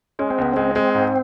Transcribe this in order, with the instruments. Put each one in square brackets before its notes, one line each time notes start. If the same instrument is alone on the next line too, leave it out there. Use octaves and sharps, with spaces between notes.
[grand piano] G#3 [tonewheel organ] C#4
[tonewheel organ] C4
[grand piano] C#2 [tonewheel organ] B3
[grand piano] G#3 [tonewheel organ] C4
[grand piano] G#3 [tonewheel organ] C4
[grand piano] G#2